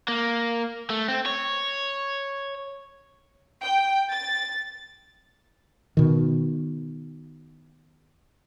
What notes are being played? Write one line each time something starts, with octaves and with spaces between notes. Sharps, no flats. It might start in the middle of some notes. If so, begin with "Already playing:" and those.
A#3
A3
C4
C#5
G5
A6
B2 D#3